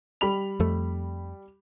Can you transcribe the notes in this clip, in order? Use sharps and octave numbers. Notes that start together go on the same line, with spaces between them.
G3 B5 F7
F2 A3